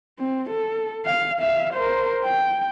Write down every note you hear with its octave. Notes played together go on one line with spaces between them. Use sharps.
C4
A4
F5
E5 F5
A#4 C5
G5